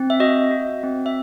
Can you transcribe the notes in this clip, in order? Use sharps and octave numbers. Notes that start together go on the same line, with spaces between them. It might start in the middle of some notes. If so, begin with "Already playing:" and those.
Already playing: C4
E5
F#4 D#5
F#4
C4
E5